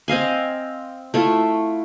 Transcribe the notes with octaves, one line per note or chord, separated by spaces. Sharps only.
C4 D#5 F5 G#5
A3 E4 F4